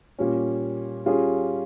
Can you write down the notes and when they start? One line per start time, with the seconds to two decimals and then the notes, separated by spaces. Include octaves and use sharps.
0.19 A#2 G3 C#4
1.06 G3 C#4 F4 G#4